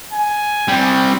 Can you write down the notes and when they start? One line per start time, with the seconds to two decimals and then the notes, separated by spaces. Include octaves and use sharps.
0.13 G#5
0.68 G3 C4